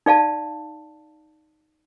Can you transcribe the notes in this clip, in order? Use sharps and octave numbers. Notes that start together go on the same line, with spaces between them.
D#4 D5 F5 A5